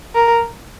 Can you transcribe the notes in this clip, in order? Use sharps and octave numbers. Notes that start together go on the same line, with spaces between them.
A#4